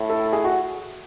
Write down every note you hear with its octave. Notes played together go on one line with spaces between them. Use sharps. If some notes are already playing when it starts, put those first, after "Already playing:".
Already playing: A2
A4
G#4
F#4